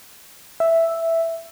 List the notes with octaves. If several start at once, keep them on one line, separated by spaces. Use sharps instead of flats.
E5